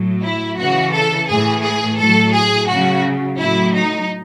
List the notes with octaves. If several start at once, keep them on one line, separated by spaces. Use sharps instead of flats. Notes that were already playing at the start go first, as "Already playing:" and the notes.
Already playing: A2 F#3
E4
C#3 E3 F#4
A4
A2 E3 G#4
G#4
A2 F#3 A4
G#4
C#3 F#3 F#4
A2 F#3 E4
D#4